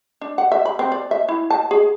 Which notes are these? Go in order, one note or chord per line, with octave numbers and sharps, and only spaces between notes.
D4
F#5
E5
B5
C4
D5
E5
E4
A5
G#4